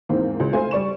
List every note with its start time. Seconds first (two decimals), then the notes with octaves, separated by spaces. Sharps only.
0.09 E2 G#2 A#3 C4
0.40 C#2
0.53 A3 F4 C5 G#5
0.71 G3 D5 C#6 E7